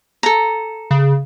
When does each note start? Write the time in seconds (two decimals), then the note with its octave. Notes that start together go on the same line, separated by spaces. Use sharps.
0.23 A4 A#5
0.91 C#3